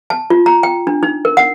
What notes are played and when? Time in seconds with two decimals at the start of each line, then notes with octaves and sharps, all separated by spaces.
0.10 A5
0.30 F4
0.46 A#5
0.63 G5
0.87 D4
1.03 D#4
1.25 A#4
1.37 F#5